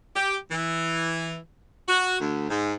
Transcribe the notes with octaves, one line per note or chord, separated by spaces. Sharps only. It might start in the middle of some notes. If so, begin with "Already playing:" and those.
G4
E3
F#4
D2
G#2